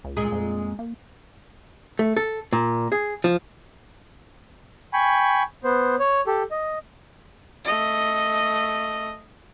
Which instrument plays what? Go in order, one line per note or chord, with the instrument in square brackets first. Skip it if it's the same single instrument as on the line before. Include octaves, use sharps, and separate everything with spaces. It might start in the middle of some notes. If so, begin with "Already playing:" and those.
[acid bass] C#2
[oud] A#2 G#3 G#4
[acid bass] F2
A#3
[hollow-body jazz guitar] A3
A4
A#2
G#4
F3
[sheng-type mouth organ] G5 G#5 B5 C#6
B3 C5
C#5
G4 A4
D#5
[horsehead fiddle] A3 D#5